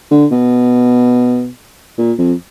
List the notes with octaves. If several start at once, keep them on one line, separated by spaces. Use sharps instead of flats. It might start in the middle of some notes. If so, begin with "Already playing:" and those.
D3
B2
A#2
F2